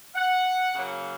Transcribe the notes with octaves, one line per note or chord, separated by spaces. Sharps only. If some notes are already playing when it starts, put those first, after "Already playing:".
F#5
C#3 F#3 A#3